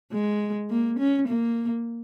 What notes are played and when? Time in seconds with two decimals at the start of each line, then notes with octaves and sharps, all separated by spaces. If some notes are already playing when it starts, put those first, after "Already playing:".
0.13 G#3
0.70 A#3
0.99 C#4
1.28 A#3